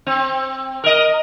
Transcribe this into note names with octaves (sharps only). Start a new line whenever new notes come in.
C4
A#4 D#5